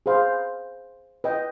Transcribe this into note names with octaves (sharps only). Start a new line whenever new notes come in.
G#4 C5 F5 B5
B4 D#5 G5